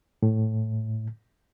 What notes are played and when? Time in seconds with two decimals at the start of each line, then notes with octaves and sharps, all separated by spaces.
0.23 A2